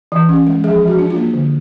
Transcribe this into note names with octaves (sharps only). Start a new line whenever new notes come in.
E3
C#4
G#3
F3 G#4
F3
F#4
D4
F4
A#3
D3